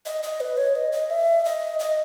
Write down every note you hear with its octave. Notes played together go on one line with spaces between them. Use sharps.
D#5
D#5
B4
C#5
D#5
D#5
E5
D#5
D#5